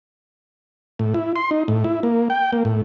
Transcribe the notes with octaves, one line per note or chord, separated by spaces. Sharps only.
A2
E4
C6
D#4
A2
E4
A#3
G5
A#3
A2